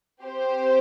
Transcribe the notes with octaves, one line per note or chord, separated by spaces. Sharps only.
C4 G4 C5